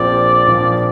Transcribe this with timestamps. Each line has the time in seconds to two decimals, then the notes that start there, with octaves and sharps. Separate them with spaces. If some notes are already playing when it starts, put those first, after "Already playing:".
Already playing: A#1 A#2 F3 C4 D5
0.47 A#1 A#2 F3 C4